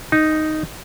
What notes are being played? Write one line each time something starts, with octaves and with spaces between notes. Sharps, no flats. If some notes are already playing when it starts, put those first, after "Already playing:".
D#4